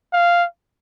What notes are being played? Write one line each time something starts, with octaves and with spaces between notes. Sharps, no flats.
F5